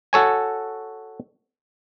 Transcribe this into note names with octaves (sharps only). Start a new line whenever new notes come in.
F#4 A4 C#5 G#5